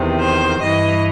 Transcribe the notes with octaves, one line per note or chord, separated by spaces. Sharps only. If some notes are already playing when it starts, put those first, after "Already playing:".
Already playing: E2 C3 D#3
C5
G2 E3 D#5